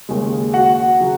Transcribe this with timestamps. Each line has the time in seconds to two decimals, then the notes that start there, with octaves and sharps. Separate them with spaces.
0.09 D#2 C#3 G#3
0.53 F#4 F#5
1.00 C#3 F#3